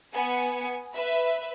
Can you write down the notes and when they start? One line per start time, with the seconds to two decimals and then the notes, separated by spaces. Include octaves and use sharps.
0.13 B3 G#5 C#7
0.95 B4 E5